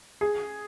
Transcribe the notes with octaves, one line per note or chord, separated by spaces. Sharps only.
G#4